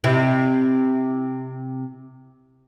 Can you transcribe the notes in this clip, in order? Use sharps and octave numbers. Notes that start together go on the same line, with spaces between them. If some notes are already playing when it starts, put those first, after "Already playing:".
C3 C4 E4